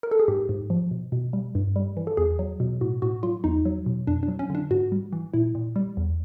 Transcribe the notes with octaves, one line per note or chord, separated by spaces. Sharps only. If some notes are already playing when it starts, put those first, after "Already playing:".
A#4
A4
G#4
G#2 G4
G#2
F3
B2
B2
G3
G2
G3
E3
A4
E2 G#4
F#3
B2
A2 F#4
A2 F#4
F#3 F4
E2 D#4
F#3
B2
F2 D4
D4
F#3
C#4
D3
D4
G#2 F#4
G3
E3
A#2 E4
A#2
G3
E2